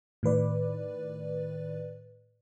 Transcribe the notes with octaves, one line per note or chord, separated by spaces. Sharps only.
A2 D#3 B4 D5